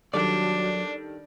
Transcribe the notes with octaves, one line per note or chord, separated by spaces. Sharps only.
D#3 F#3 G3 D4 A4 D5